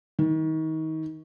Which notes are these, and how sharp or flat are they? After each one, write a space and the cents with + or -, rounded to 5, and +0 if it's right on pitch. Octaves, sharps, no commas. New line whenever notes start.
D#3 +30